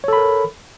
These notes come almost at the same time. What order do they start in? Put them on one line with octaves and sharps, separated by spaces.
C#5 A4 B5 A#4